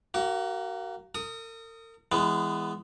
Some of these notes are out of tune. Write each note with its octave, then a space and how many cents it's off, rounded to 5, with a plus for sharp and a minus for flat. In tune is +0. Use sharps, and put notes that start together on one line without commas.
A#3 -10 F#4 +30
A#4 -45 D#6 +5
E3 +0 G#3 -15 B3 +15